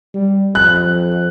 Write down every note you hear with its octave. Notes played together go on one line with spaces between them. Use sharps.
G3
F2 F#6